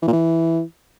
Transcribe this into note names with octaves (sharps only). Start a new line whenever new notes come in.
E3
A#2
E3